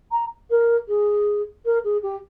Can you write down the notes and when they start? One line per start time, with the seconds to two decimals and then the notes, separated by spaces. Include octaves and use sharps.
0.12 A#5
0.50 A#4
0.88 G#4
1.65 A#4
1.84 G#4
2.03 G4